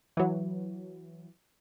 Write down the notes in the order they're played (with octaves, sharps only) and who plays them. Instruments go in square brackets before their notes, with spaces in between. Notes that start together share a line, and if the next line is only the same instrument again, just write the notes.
[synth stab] E3 F#3